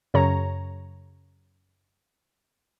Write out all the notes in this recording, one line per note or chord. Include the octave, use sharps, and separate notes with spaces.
F#2 C#3 C#5 A#5